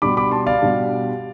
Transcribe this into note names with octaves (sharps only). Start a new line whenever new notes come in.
B2 G3 D4 B5 D6
B5 D6
A5 C6
D5 F5
B2 G3 D4